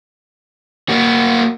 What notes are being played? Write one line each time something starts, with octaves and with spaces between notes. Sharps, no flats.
A#3 F#4